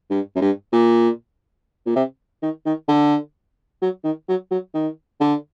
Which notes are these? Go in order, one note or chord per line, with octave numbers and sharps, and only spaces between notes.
G2
F#2
G2
A#2
A#2
C3
D#3
D#3
D3
F#3
D#3
F#3
F#3
D#3
D3